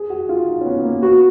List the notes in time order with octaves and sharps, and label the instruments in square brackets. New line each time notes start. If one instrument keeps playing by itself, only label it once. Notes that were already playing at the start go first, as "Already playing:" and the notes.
Already playing: [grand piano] G#4
F#4
F4
D#4
C#4
B3
A#3
[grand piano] B3 [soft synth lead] F#4